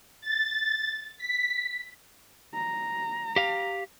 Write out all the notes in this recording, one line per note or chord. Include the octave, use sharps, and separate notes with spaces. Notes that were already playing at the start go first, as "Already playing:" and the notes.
A6
B6
A#5
G4 F5